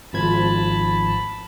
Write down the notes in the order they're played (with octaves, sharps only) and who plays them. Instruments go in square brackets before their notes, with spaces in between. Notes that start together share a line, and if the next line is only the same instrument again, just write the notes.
[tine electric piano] G#1 F3 G#6 [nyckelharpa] A5 B5